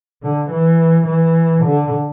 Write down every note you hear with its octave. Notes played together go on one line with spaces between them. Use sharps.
D3
E3
E3
D3